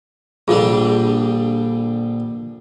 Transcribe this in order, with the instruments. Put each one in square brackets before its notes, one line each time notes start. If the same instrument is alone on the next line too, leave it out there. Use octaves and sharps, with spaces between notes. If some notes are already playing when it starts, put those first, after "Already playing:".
[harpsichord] A#1 D3 G3 [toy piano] F4 G#4